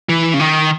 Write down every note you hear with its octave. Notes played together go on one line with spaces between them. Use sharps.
E3
C#3
D#3